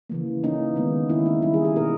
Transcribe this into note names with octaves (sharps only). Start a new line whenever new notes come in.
C#3 E3 A#3
E3 A#3 C#4 D#4
D#3 G#3 B3
D#3 A#3 C#4 E4
D#4
D#3 G3 C#4 E4
G#4
G#4
B2 A#3 C#4 A#4